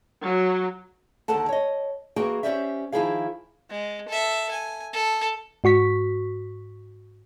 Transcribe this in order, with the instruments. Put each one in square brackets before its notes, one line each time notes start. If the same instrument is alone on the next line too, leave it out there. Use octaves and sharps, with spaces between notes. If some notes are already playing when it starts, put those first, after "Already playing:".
[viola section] F#3
[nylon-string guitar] D#2 D3 A4 F#5 A5
C#5 D#5
E3 A#3 F#4 G#4 G5
C#4 D4 G4 C5 D5 E5
D#3 F3 E4 F4 G#4 F5
[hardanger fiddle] G#3
A4 E5
G#5
A4
[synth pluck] G#2 F#4 C#6 B6